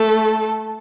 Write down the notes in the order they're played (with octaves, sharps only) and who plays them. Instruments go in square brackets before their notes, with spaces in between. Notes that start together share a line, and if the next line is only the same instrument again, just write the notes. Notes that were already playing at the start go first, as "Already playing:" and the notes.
Already playing: [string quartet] A3 A4